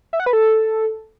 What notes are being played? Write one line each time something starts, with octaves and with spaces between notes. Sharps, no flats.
E5
F#5
B4
A4